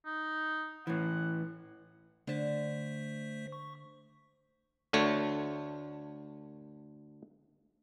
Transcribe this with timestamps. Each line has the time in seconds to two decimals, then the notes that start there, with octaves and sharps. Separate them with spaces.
0.05 D#4
0.87 A2 E3 F#5
2.27 D3 A3 C5 A5 B6
3.52 C#6
4.93 D2 D3 A3 C#5